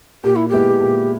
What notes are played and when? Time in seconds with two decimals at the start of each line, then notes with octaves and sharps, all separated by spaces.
0.24 A#2 G4
0.36 E4
0.49 G#3 B3 E4 G4
0.81 A#2